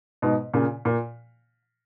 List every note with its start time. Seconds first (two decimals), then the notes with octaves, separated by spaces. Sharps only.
0.22 G#2 B2
0.54 A#2 C#3
0.85 A#2